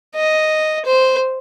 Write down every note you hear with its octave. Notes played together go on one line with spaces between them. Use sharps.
D#5
C5